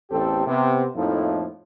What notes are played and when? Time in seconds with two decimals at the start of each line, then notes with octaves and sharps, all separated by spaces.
0.10 A1 E2 C4 G4 A4
0.47 C3 B3
0.96 F2 A2 F3 A#3 D#4 E4